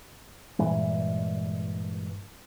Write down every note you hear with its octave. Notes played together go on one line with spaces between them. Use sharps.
G2 A#2 E3 G#3